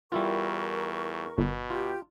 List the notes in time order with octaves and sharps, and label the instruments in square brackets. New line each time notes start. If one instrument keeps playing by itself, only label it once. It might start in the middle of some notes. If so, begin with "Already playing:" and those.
[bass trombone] E2 [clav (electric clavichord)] G3 E4 F4 [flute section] A#4 C#6
[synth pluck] G1 [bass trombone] B2
[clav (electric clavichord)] F4 [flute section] G4